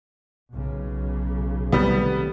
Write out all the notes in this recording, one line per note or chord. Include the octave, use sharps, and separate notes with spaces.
B1 C#3
C3 D#3 G3 A3 B3